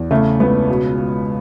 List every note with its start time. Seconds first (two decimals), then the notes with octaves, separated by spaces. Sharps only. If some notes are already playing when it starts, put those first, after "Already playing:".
Already playing: E2
0.11 C#3 A3
0.40 C#2 B3
0.68 B2